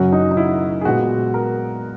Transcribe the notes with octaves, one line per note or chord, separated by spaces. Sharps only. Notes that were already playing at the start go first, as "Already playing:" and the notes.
Already playing: F#2 C#3 F#3 C#4 F#4
D#4
D#4
E4
G#4
A#2 G#3 B3 F#4
A#4